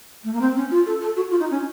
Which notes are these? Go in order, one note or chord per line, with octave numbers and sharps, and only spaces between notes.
A3
A#3
C4
C#4
F4
A4
A4
F#4
F4
D#4
C#4